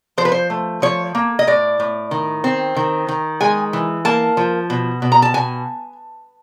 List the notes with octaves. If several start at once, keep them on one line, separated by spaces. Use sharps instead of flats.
F3 C5
B4
C5
A3
F3 C#5
A#3
D#5
A2 D5
A2
D#3
C4
D#3
D#3
G#3 G#5
E3
A#3 A5
F3
B2
B2
A#5
A5
B2 G#5